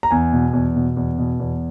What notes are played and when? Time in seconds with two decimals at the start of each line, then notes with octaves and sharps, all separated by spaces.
0.03 A#5
0.11 E2 G#5
0.33 B2
0.53 E2
0.76 B2
0.97 E2
1.18 B2
1.40 E2